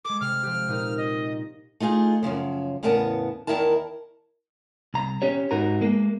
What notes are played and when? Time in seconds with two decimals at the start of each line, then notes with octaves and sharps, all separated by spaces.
0.05 G#3 A4 D6
0.21 C3 F6
0.43 F3 C4 G4
0.68 A#2 D#4 A#4
0.97 D#5
1.80 A3 D#4 F4 G#4
2.23 F#2 A#2 C#3 F3
2.83 E2 A2 C#3 B3 A#4 A5
3.47 E2 G2 D#3 E4 A#4 A5
4.94 C2 A#5
5.22 C#4 G4 C#5
5.51 G#2 D#4 F#4 A#4 A#5
5.81 G#3 A#3